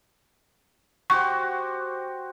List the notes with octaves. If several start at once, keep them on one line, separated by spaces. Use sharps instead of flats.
F#4 G4 C5 C#6